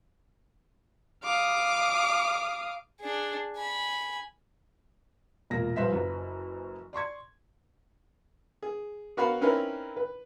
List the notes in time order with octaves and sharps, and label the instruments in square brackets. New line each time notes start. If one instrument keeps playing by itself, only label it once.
[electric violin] F5 D#6 [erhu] D6
[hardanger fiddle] D4 G#4
G#5 B5
[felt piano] E1 A#2 A#3 A#6
A#1 G2 B4 C5 E5 B6
F#1 F#2 B4
D5 C6 C#6 G#6
[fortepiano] G#4
B3 F#4 A#4 C#5 F5 B5
C4 C#4 D#4 E4 A#4 B4
B4